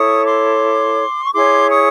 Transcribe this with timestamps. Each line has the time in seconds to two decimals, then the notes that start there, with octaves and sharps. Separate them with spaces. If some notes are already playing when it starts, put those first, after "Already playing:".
Already playing: E4 A4 C#5 C#6 D#6
0.25 C6 D6
1.24 C#6
1.33 E4 G#4 C#5 C6 D6
1.69 C#6 D#6